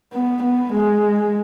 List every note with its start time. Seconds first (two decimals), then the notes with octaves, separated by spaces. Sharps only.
0.13 B3
0.43 B3
0.72 G#3